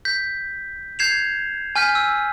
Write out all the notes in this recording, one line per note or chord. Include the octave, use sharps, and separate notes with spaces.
G6 B6
G6 G#6 C7 E7 F7
G#5 F6 G6 B6 D#7
E6